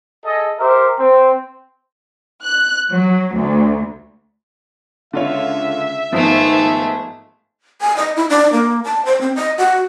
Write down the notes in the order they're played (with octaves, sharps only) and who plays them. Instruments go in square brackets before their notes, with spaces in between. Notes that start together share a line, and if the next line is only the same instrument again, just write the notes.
[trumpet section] G#4 A4 D#5
G4 A#4 C5 E5
C4
[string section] F#6
F#3
D2
[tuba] C#2 [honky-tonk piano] D3 F4 C#5 [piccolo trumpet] E5
[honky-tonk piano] G#1 F3 B3 [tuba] D#3 [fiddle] G#3 A3
[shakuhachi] G#5
D#5
E4
D4
A#3
A5
C5
C4
D#5
F#4